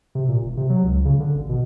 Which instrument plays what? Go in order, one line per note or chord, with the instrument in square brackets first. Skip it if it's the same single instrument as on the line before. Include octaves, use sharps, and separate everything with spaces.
[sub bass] C3
A#2
E1
C3
F#3
C#2
C#3
D3
G#1
B2